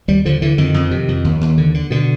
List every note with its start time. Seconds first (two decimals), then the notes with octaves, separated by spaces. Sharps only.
0.08 D#2 G3
0.25 D3 F3
0.42 D3 E3
0.58 F2 D#3
0.74 F2
0.91 C3
1.08 F2
1.25 D#2
1.41 D#2
1.58 D3
1.74 D3
1.90 B2 D3